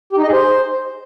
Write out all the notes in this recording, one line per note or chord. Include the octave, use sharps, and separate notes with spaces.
G4
D#4
D#5
G#4
C5